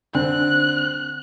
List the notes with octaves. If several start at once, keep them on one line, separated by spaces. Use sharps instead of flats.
D3 C4 F#6